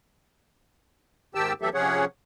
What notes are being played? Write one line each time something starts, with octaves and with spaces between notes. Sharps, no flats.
G#2 D#3 G4 G5 A5 E6
E3 F#3 A3 G4 A4 E5
C3 F3 C#4 G#4 C#5 F#5